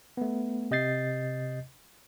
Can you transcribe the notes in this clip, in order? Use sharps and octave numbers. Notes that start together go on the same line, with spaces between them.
A3 B3
C3 D#5 G6 A6 C7